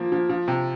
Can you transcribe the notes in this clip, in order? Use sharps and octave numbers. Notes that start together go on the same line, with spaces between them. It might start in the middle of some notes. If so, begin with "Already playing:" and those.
Already playing: F3 A#3
F3
F3
C3